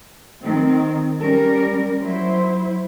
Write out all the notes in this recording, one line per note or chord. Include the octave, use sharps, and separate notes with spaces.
D#3 C4
G3 C#4 A#4
F#3 E4 C5